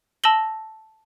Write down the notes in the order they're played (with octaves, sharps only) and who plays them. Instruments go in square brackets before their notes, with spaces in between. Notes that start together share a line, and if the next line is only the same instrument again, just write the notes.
[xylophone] A5 E6 A#6 F#7 G7